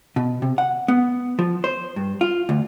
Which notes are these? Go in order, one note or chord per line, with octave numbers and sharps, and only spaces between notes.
B2
C3
F#5
B3
F3
C5
G2
F4
D2